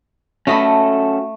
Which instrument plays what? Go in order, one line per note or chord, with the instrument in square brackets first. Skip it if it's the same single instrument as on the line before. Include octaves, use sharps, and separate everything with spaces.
[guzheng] A3 D#5 B5 [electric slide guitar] C#4 F#4 A4